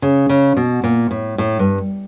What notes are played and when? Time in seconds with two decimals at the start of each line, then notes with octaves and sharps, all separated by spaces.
0.02 C#3
0.29 C#3
0.57 B2
0.84 A#2
1.11 A2
1.38 A2
1.59 G2